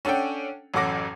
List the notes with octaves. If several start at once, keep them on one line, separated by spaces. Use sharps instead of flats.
C#4 D4 A4 F#5 G5
A1 F#2 A4 F#5 D6 A#6